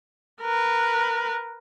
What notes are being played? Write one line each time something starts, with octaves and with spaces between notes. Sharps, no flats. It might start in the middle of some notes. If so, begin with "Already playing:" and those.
A#4 B4